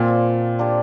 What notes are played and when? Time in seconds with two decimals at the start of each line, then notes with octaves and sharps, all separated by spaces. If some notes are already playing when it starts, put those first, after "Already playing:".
Already playing: A#2 F3 C4 F4 D5
0.59 A#3 D4 G4 C5